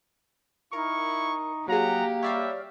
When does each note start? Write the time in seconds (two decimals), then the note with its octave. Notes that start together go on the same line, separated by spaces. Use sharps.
0.73 D#4 E4 A#4 C#6
1.68 F#3 A#3 G4 G#4 F#5 A#5
2.23 G3 C#5 D5 E5 F5